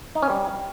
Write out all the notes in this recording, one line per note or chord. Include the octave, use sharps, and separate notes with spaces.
D#4
C#4
G3